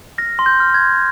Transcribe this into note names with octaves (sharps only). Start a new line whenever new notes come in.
F6 A#6
C6
G6
F6
G#6
C6